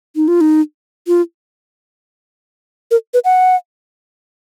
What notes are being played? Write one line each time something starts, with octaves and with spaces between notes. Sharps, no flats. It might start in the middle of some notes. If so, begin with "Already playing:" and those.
D#4
F4
D#4
F4
A#4
B4
F#5